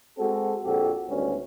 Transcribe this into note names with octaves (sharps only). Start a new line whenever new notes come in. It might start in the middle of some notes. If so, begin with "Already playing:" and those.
G#3 C4 F#4 A4
A#1 F2 F#4 G4 A4
G#1 D2 G3 B3 C#4